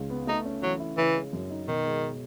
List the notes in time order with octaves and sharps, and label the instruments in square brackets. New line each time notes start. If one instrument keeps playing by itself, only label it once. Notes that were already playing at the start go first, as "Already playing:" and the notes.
Already playing: [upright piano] C#2 C#3 G#3
B3
[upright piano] A3 [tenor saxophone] D#4
[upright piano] C#4
[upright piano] E3 [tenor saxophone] F#3
[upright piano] E4
[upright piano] C#3 [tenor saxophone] E3
[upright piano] G#3
F#2
D#4
[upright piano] B2 [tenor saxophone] D#3
[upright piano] G#3